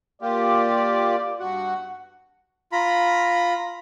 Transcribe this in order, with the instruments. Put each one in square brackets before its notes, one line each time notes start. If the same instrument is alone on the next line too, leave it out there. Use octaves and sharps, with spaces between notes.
[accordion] A#3 F4 G4 [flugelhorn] D5
[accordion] G2 F#4 F#5
[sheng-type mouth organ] F4 A#5 B5